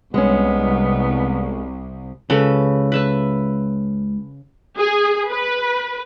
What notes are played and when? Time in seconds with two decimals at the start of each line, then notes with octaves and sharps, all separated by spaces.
0.14 C2 G#3 B3 C#4
2.30 C#2 C#3 A4 B4
2.92 B4 E5 A5
4.78 G#4
5.30 B4